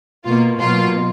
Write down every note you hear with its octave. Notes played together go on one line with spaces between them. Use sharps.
B2 A#3 F4
B2 F#3 A#3 F4